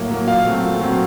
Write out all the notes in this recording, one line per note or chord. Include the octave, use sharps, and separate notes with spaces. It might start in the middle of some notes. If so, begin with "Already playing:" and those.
Already playing: A2 F#3 A#3
F#3 A#3
A#2 F5
F#3 A3 C4
A#2
F#3 A3 C4